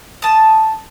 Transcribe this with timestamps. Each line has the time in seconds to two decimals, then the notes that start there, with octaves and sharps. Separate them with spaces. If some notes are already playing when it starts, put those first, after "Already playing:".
0.22 A5 D#6